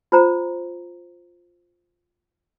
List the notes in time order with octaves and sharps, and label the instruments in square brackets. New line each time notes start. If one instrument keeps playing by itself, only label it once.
[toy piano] F4 C5 A#5